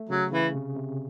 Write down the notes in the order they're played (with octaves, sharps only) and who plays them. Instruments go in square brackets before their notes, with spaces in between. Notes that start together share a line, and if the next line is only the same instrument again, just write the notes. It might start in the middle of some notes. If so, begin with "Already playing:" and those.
Already playing: [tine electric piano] A3
[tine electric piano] C#3 [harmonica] F#3
[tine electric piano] C#3 [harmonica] E3
[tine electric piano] C3
C3